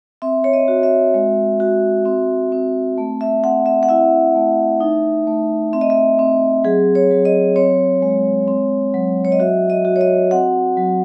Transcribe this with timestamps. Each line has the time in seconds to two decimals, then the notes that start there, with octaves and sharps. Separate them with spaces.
0.22 C4 E5
0.44 C#5
0.53 D#5
0.68 F#4
0.83 E5
1.14 G#3
1.60 F#4
2.05 C4
2.52 C4
2.98 A3
3.21 E5
3.44 C4 F#5
3.66 E5
3.83 F#5
3.89 E4 E5
4.35 A3
4.81 D#4
5.27 A3
5.73 C4 E5
5.81 D#5
5.90 E5
6.19 C4
6.64 F#3 G#4
6.95 C#5
7.11 F#3
7.25 D#5
7.56 C4 C#5
8.02 G#3
8.48 C4
8.94 F#3
9.25 C#5
9.32 D#5
9.40 F#4 E5
9.70 D#5
9.85 F#4
9.96 C#5
10.01 D#5
10.31 C4 F#5
10.77 F#3